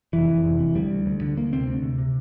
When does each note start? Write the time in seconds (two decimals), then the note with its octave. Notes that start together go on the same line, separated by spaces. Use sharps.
0.13 F1 E3
0.28 F2
0.44 F1
0.59 C3
0.75 D2 G3
0.90 D2
1.06 D2
1.22 D3
1.37 D2 A#3
1.52 C3 C4
1.67 D2
1.83 C3
1.98 C3